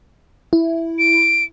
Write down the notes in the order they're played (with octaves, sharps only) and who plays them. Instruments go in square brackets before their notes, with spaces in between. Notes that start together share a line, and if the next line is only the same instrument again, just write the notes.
[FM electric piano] E4
[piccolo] D7